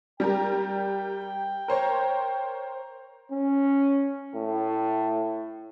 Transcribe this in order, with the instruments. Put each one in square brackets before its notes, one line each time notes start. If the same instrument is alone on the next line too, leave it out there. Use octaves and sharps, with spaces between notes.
[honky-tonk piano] G3 G4 A#4 [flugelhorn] G5
[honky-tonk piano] A#4 C5 C#5
[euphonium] C#4
A2